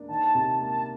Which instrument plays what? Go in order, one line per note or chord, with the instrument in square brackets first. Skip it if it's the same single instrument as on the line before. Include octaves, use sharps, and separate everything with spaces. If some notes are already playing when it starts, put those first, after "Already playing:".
Already playing: [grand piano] A#3 D4
[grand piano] D#3 [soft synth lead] A5
[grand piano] C3
[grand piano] A#3 [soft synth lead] A5